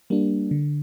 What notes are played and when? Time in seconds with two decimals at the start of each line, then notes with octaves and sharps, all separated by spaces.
0.10 G3 A#3 D4
0.51 D3